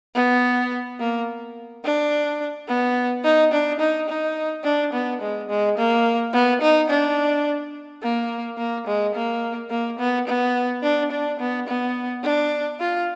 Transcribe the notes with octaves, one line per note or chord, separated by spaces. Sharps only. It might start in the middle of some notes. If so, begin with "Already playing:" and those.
B3
A#3
D4
B3
D#4
D4
D#4
D#4
D4
B3
G#3
G#3
A#3
B3
D#4
D4
A#3
A#3
G#3
A#3
A#3
B3
B3
D4
D4
B3
B3
D4
F4